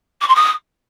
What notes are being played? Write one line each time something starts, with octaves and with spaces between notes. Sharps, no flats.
D6
C6
D#6